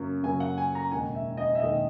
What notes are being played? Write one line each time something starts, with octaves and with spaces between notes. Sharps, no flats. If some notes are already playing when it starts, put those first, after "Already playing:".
Already playing: F#2 C#3 F#3 A#3
F#2 C#3 F#3 A#3 G#5
F#5
G#5
A#5
E1 D#2 D#3 G#5
E5
D#5
E5
E1 D#2 D#3 D#5